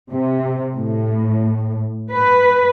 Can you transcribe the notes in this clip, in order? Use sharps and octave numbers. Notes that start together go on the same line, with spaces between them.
C3
A2
B4